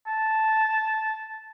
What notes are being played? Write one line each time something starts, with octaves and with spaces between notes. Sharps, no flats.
A5